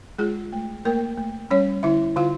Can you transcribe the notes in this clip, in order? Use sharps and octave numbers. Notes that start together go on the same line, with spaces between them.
G#3 F4 G#4
A3
A3 A#3 A#4
A3
G3 C#4 C#5
D3 E4 E5
D3 F4 F5